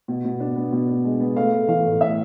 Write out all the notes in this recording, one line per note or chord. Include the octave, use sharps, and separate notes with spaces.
B2
B2
D4
B3
B2
D4
G#3
B3
A3 F5
A3
E3 F5
A2
A3 E5